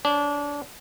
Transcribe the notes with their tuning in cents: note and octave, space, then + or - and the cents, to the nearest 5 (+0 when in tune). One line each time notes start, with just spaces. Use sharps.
D4 -25 C#5 -15